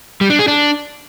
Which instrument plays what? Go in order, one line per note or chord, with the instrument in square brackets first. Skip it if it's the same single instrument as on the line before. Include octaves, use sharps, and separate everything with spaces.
[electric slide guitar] G3
D4
G#4
D4